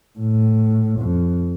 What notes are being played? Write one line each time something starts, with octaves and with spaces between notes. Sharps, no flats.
A2
F2